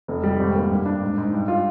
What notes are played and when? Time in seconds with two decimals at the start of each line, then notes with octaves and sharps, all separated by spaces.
0.08 F1
0.23 G3
0.40 G#1
0.55 A#3
0.71 G2
0.86 D4
1.02 G#2
1.18 G#2
1.33 G2
1.48 F4